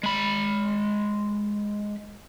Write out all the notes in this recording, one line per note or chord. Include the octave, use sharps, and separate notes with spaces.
G#3 B5